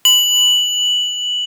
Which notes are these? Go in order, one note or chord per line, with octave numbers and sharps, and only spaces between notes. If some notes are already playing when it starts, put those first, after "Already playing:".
F#7